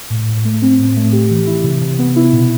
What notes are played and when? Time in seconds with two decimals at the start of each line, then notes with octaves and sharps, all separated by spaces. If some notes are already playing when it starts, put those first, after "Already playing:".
0.10 A2
0.28 A2
0.45 A3
0.62 C4
0.79 A2
0.96 A3
1.13 G4
1.31 E3
1.47 E4
1.64 C3
1.81 C3
1.99 B3
2.16 E4
2.33 B2